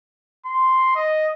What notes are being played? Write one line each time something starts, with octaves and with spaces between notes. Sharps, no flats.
C6
D#5